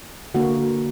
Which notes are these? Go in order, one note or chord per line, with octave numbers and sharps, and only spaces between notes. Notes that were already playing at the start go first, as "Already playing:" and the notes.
D3 A#3 F#4